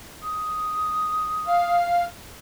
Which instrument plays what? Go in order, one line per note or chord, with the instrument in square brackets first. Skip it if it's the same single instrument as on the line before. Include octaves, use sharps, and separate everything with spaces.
[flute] D#6
[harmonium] F5